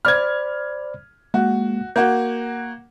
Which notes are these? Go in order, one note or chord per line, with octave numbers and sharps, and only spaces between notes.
C5 D5 B5 F6 G#6
G#3 A#3 F#4
A#3 F#4 G6